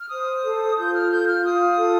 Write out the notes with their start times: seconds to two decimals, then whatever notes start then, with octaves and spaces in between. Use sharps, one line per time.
0.01 F6
0.10 C5 D#6
0.44 A4
0.77 F4 G6
0.95 F6
1.11 F4 G6
1.29 F6
1.44 F4 D#6
1.79 A4